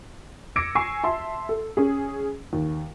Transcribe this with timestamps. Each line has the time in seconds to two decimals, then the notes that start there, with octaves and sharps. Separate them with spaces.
0.56 D6 E6 G#6 A#6 C#7 D7
0.75 G#5 C#6 E6 C7
1.04 E5 A5 C6
1.49 A4
1.77 C#4 G#4
2.53 D#2